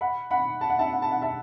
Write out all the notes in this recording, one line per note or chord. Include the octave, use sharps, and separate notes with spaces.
F#5 B5
F#5 B5
A5
F#5
E5 A5
F#5
A5
F#5
E5 A5